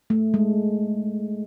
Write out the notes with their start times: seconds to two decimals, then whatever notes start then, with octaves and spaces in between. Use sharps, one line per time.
0.10 A3
0.34 G#3